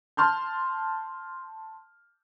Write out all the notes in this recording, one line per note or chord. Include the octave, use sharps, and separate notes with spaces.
A5 C6 F6 G6